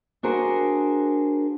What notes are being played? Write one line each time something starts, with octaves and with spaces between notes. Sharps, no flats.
D4 F#4 G#4 A#4 C5